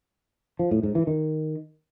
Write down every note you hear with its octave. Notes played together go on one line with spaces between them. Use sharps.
F3
A2
G#2
E3
D#3